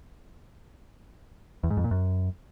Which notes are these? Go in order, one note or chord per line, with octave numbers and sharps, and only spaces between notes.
E2
G#2
F2
A#2
F#2